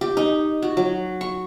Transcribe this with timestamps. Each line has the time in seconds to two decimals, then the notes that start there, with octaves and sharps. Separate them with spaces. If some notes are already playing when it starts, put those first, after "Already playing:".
0.01 G4
0.17 D#4
0.62 F#4
0.77 F#3
1.21 C#6